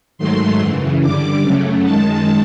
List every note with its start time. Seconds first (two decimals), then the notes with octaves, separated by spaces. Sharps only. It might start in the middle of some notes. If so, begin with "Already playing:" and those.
0.18 G#2 D#3 F#3 A3 C6
0.59 F#2 C#3 E3
1.02 G2 D3 G3 D6
1.42 F#2 C#3 F#3 A3
1.84 F#2 D#3 G#3 A5